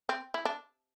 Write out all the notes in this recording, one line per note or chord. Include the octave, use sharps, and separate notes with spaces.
C4
E4
D4